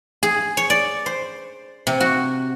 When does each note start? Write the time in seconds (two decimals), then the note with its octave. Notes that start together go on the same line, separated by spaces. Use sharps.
0.23 G#4
0.57 C#5
0.70 D5
1.06 C5
1.87 C3
2.00 F#4